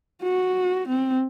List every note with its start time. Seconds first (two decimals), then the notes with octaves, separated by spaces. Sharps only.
0.23 F#4
0.88 C4